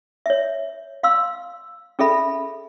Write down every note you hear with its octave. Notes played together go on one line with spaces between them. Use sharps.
C#5 E5
F5 C6 E6
C#4 G#4 A4 E5 B5